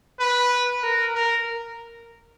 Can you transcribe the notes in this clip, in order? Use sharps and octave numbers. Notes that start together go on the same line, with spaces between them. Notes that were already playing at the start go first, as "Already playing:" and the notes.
B4
A#4
A#4